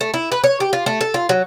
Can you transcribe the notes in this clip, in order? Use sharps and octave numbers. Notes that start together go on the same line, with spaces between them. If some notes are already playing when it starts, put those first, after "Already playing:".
A3
E4
B4
C#5
G4
F4
A3
A4
F4
F#3